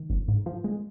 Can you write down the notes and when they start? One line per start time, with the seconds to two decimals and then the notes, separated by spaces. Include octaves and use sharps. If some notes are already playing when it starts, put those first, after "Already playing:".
Already playing: D#3
0.10 G1
0.28 G#2
0.46 F3
0.64 G#3